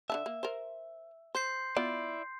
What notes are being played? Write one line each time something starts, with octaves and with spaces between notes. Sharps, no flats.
D3 E3 E5 A5
A#3
A#4 C5
C5 C6 G6 C7
B3 E4 F4 D5